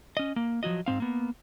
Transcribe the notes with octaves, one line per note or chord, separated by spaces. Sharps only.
C#4 D#5
A#3
F3 F#3 F#4 D#5
G#2 C4 F5
A#3 B3